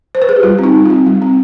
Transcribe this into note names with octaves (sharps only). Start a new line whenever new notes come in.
C5
B4
G#4
G4
G3 F4
C4 D#4
G3
C4 F4
G3
C4